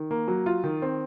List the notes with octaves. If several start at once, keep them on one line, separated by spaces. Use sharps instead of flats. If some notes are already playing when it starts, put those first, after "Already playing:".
Already playing: D#3
A#3
F#3
F4
D#3
C4